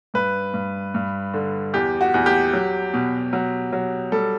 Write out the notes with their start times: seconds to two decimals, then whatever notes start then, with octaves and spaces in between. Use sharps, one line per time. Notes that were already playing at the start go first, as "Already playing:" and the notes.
0.14 G2 B4
0.54 G2
0.94 G2
1.34 D3
1.73 E2 G4
2.01 F#4
2.14 E2
2.26 G4
2.53 F#3
2.93 B2
3.33 F#3
3.73 F#3
4.12 G3 A4